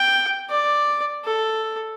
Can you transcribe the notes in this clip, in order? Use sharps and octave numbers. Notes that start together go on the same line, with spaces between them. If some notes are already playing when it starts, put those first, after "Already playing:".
Already playing: G5
D5
A4